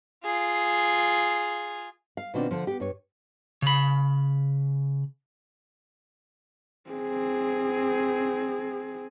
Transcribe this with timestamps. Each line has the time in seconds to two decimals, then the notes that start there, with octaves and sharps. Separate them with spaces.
0.25 F4 G#4
2.17 F5
2.34 B2 D#3 A#3 C4 D4 F4
2.51 D3 F3
2.67 B3 G4
2.80 G2 C#5
3.62 C#3 B5
6.90 C4 G#4